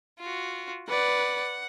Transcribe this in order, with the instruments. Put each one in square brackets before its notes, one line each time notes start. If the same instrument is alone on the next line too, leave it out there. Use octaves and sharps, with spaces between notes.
[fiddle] F4 F#4
[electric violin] B4 D5 [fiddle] F#5